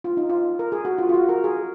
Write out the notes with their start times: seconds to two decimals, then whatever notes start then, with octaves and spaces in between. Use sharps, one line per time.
0.04 F4
0.17 D#4
0.29 F4
0.59 A#4
0.72 G#4
0.85 F#4
0.98 F4
1.09 F4
1.14 F#4
1.29 A#4
1.44 G#4